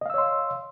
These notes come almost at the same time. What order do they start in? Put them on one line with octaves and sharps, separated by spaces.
D#5 F5 E6 C#5 C6